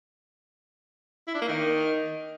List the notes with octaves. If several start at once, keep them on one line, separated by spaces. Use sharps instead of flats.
E4
D4
A#3
D#3